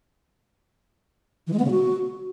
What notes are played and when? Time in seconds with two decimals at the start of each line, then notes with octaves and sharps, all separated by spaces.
1.47 E3
1.53 G#3
1.59 B3
1.65 C#3
1.71 F#4